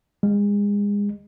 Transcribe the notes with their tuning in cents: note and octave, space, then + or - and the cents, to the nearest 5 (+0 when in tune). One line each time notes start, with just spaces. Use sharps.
G#3 -30